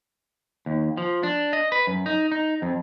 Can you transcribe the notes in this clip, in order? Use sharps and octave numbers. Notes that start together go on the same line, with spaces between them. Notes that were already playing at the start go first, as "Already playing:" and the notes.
D#2
F3
D4
D#5
B4
F#2
D#4
D#4
F2